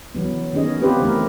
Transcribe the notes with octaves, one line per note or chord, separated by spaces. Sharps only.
C#3 E3 F#3 B3
D#3 B3 C#4 G#4 D#5
B3 C4 F4 G4 B4 C5
C#3 E3 A3 E4 A#4